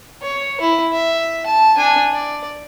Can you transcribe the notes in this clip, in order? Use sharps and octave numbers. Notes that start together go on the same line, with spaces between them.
C#5
E4
E5
A5
D4 G#5
D5